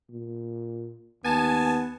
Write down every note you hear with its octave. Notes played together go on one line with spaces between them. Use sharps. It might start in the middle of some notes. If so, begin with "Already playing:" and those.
A#2
D#2 B3 G#5 A5